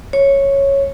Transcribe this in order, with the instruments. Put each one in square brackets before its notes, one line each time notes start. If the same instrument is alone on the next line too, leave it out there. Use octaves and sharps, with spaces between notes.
[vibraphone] C#5